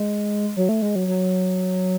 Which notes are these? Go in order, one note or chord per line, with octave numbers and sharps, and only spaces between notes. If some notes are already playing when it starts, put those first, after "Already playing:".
Already playing: G#3
F#3
A3
G#3
F#3
F#3